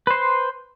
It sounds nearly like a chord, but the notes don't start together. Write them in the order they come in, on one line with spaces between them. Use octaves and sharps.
B4 C5 C6